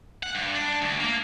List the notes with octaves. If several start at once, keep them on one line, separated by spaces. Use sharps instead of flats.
F#5
G2
D4
D2
A#3